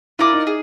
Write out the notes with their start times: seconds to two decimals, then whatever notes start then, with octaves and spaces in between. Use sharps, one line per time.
0.19 E4 F4 A#4 D5
0.33 D#4
0.47 G#4